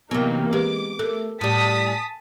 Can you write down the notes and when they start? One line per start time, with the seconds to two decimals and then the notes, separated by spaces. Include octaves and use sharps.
0.11 C3 E3 F#3 A#3 B3 D#4
0.53 G#3 G4 B4 D6
0.99 A3 A4 A#4
1.41 A2 G3 A5 D#6 B6
1.87 G#5